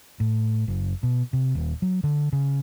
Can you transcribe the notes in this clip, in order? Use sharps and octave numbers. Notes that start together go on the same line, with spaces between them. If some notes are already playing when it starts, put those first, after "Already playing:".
A2
F#1
B2
C3
D#1
F#3
D3
C#3